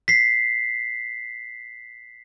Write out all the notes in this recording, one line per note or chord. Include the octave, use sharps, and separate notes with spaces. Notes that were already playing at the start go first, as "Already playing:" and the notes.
B6 C7